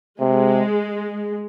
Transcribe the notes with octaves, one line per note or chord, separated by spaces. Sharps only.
C3 G#3